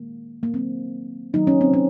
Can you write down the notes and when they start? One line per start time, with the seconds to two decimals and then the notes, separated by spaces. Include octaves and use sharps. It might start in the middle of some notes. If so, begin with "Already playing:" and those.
Already playing: D#3 G#3 A#3
0.43 A#3
0.54 D#3 F#3 A#3 C4
1.33 D#3 F#3 A#3 D#4
1.47 C#4
1.61 C4
1.74 C#4